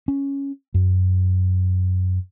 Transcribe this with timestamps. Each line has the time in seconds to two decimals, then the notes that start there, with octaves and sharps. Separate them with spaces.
0.08 C#4
0.74 F#2